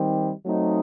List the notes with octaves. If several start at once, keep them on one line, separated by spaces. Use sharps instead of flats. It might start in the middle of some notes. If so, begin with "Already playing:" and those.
Already playing: D#3 G3 C4 D#4 G4
F#3 A3 C4 D#4